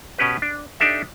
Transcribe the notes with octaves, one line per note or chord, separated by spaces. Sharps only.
B2 C#4 G4 B4
D4
D4 D#4 G4 A4 E5